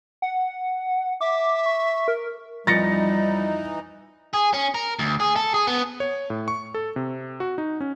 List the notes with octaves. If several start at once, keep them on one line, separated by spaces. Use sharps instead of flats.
F#5
E5 D6
C#6
A#4
F2 E3 F3 G3 D#4 A6 A#6 C#7
G#4
C#4
A#4
D2
G#4
A4
G#4
B3
C#5
A2
C#6
A4
C3
F#4
D#4
C#4